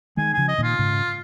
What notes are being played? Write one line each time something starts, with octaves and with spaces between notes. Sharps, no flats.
D#3 G#3 G#5
C#3 F3 G#5
D#5
A#2 D#3
F4
G#2 C#3